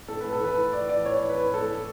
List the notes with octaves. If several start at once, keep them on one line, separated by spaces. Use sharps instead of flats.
A2 A4
B4
A2
A4
E3 B4
E3
E3 D5
E3 D5
A2 C#5
E3
B4
A2
A2 A4
A2